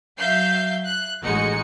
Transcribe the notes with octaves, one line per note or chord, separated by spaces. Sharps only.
F#3 E5 F5 G6 C7
F#6
A1 G#3 D#4 F#4 C#7